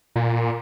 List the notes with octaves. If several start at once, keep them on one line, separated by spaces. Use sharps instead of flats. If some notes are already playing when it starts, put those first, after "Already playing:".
A#2